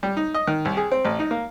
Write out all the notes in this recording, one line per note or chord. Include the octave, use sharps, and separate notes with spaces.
G3
D#4
D#5
D#3
C2
G#4
C4
A1
D#4
A#3